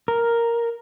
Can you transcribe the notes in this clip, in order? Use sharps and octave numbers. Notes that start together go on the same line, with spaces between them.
A#4